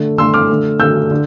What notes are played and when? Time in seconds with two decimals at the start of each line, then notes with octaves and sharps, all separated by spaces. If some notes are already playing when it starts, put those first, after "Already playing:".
Already playing: D3 A3
0.18 D3 A3 C6 E6
0.34 D6 F6
0.49 D3 A3
0.80 D3 A3 E6 G6
1.11 D3